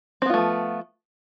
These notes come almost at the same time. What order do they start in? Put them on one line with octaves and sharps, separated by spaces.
C4 B3 F4 A3 F3